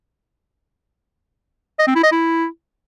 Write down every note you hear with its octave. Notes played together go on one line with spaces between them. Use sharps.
D#5
C4
E4
D#5
E4